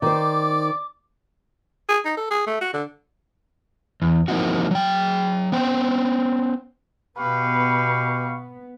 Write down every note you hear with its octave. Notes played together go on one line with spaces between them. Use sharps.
D#3 C5 D5 D6
G#4
D#4
A4
G#4
A3
F#4
D3
E2
F3 A#3 C4 D#4 E4 F#4
F#3 G5
B3 C#4 C5 G5
B2 B3 G4 B4 F5 C#6